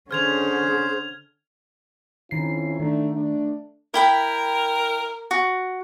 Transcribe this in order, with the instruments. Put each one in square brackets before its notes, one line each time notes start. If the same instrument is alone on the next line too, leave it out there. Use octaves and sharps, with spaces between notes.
[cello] D3 C#4 [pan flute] G#4 [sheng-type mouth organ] C5 [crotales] F6 G#6 F7
[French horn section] F2 C#4 E4 [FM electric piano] D#3 C7
[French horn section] D3 A3 D4 [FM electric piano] D#3
[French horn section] A3 D4
[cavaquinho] E4 G5 B5 [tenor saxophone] A#4
[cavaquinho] F#4